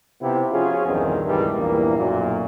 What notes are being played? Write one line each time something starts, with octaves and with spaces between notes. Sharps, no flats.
C3 B3 E4 F4 G4
F3 C#4 F4 F#4 G#4
A#1 E2 G2 D#3 C4 G#4
C#2 G2 D#3 E3 G3 G#3
A#1 E2 G2 E3 A#3
B1 F#2 A#2 F#3 A#3 F#4